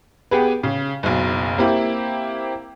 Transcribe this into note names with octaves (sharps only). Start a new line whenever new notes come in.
B3 G4 G#4 B4
C#3
F#1 B1
A#3 C4 E4 G4